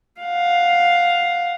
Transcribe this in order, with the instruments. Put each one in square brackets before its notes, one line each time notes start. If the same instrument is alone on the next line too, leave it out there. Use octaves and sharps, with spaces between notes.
[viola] F5 F#5